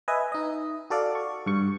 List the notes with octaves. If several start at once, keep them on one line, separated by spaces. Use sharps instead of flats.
B4 D#5 E5 G#5
D#4 D#5
F#4 A4 D5 F5
C#6
G2 C#6